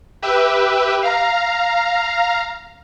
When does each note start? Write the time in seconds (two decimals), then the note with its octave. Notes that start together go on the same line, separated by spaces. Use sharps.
0.22 G4 B4 E5
1.03 F5 A#5